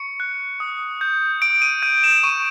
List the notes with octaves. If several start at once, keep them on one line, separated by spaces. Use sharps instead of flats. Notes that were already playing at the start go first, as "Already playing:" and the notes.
Already playing: C#6 C#7
F#6
D#6
G6
D#6 D7
D#7
G6 D#7
E7
C#6 D#7